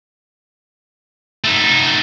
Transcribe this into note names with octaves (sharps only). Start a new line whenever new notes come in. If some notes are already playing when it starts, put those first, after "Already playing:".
A3 D#4